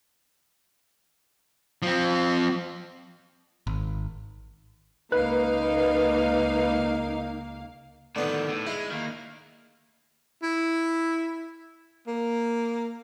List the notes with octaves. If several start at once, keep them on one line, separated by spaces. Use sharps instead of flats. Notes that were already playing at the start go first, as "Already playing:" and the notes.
F3 C4
G#1
C#2 A#3 D#4 B4 F5
A2 D3 D#3 B3
A2
G#3 E4
D#3 A#3
E4
A#3